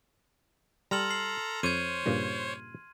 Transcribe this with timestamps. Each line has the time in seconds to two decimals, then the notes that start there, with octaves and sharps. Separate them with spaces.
0.91 G3 A4 A#5 C6 F6 F#7
1.10 C7 F#7
1.63 F2 C5 C#5 G#6 D#7
2.06 G2 A#2 C#3